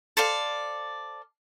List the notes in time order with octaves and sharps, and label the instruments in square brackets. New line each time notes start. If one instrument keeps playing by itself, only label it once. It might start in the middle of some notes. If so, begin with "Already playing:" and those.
[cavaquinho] A4 C5 D5 F5